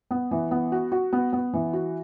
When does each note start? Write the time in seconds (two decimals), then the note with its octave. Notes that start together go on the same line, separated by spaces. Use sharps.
0.11 B3
0.31 E3
0.51 B3
0.72 F#4
0.92 F#4
1.13 B3
1.33 B3
1.53 E3
1.73 F#4